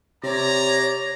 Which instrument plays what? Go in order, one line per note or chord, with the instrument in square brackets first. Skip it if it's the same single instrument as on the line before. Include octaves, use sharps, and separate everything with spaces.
[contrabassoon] C3 [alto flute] C#5 [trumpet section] D5 A#5